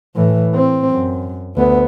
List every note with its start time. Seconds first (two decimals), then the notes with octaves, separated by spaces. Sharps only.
0.15 A2 E3
0.55 C4
0.90 F#2
1.56 D2 B3